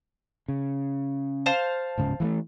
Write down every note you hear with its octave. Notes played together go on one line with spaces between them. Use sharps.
C#3
C5 F5 A5
D1 G#2 C#3
E3 G#3 A3